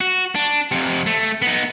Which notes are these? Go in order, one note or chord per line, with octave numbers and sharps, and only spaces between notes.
F#4
D4
F2 C3
A3
B3 D#4